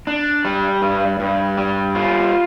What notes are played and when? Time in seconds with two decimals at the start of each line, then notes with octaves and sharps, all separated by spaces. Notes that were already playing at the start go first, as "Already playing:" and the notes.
0.07 D4
0.45 G3
0.82 G2
1.20 G2
1.58 G3
1.95 F4